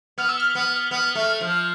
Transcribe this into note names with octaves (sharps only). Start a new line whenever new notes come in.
B3 F6
E6
F6
B3
B3
A3
F3